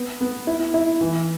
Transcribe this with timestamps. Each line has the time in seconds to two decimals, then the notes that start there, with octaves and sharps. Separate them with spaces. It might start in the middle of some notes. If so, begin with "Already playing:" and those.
Already playing: B3
0.21 B3
0.47 E4
0.74 E4
1.01 E3